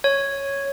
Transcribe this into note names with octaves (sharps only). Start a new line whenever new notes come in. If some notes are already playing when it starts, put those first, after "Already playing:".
C#5